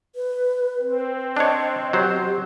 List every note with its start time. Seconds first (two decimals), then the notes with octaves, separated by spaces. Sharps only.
0.16 B4
0.80 C4
1.37 D4 C#5 D#5
1.93 F#3 G4 C5